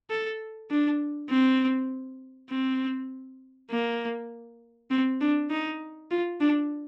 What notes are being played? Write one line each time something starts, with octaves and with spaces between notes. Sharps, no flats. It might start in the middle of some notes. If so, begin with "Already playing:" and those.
A4
D4
C4
C4
A#3
C4
D4
D#4
F4
D4